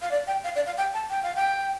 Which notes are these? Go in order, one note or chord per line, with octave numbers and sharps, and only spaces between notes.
F5
D5
G5
F5
D5
F5
G5
A5
G5
F5
G5